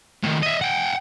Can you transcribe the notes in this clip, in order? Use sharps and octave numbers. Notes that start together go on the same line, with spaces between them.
A2 D#3
D#5 E5
F#5 G5